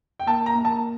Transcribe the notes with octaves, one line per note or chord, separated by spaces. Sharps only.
G5
A#3 A5
A#5
A#3
A5